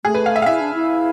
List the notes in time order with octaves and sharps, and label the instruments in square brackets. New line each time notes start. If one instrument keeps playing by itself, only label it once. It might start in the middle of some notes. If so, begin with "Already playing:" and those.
[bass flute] A3 [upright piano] G#4
[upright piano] B4
F5
E5
F5
[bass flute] E4 [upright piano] E5
[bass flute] D4
E4